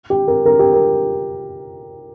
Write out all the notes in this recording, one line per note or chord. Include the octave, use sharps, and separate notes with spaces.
G4
A#4
A#4
G4
A#4